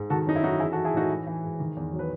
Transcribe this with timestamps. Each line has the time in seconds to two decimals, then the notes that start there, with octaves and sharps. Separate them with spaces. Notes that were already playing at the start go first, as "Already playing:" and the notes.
Already playing: G#2
0.10 D#3 F#4 A4
0.27 F#2 D#4
0.36 E4
0.44 F#3 D#4 F#4
0.59 E3 E4 G#4
0.72 F#4 A4
0.76 E3
0.85 E4 G#4
0.94 A2 D#4 F#4
1.10 E3
1.27 E3
1.43 G#2
1.60 D#3
1.76 E2
1.93 F#3
1.99 B4